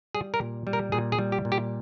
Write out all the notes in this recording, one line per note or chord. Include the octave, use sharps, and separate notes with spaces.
G3 G#4
A#4
A#2
G3
A#4
A#2 G#4
G#4
G3
G4
A#2
G4